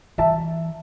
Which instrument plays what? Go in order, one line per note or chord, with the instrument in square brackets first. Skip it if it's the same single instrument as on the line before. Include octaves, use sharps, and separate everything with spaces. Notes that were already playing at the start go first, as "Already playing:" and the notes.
[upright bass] E3 [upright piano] E5 A5